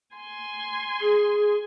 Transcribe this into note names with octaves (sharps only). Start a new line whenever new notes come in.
G#5 C6
G#4